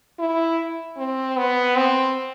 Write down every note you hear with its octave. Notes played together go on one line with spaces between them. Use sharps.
E4
C4
B3
C4